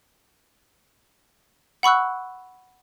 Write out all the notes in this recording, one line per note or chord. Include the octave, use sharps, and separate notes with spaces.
F#5 B5 C#6 E6 F#6